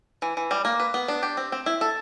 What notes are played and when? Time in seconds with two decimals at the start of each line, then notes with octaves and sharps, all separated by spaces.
0.22 E3
0.37 E3
0.51 G3
0.65 A#3
0.80 B4
0.94 B3
1.08 D4
1.23 G4
1.37 C4
1.52 C4
1.66 E4
1.81 A4